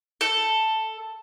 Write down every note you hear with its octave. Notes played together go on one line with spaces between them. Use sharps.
A4